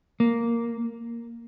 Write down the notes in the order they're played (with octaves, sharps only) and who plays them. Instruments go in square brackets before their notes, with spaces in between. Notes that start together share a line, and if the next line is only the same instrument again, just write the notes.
[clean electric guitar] A#3